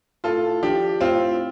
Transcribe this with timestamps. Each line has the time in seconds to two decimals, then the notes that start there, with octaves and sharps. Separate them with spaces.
0.24 A2 F4 A4
0.63 F3 D4 G4
1.01 A2 C4 F4